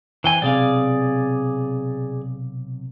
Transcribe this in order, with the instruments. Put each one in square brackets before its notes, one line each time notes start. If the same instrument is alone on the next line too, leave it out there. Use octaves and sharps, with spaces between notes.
[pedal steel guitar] E3 G#5 [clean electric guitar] C5 G5
[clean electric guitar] B1 C3 F5 [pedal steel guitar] G#4 D5